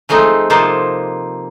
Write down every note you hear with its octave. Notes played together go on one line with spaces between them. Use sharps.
F3 G#3 A3 C4 D#4
C3 F3 A#3 D#4 C5 A5